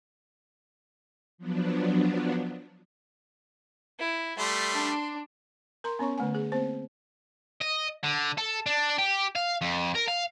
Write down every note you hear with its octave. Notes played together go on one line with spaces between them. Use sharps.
F3 F#3 B3 D4
E4
G3 A3 C6
D4
A#4 A#5 C6
B3 C#4 C#5 C#6
D3 A3 G#5
G#4
A#3 C4 C5
D#5
D3
A4
D4
G4
F5
F2
A#4
F5